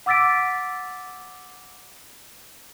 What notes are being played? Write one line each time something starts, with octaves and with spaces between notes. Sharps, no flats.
F#5 D6 E6 A6 B6 D7